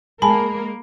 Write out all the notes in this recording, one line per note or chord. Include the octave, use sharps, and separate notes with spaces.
G#3 A#3 A#4 G#5 A5 B5